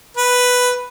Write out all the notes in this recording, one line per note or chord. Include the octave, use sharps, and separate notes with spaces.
B4